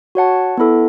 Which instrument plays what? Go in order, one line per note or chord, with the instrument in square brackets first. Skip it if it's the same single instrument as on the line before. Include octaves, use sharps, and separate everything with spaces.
[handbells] F#4 C#5 F#5 A5
B3 E4 A4